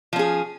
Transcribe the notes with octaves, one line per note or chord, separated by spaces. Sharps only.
F3 C#4 G#4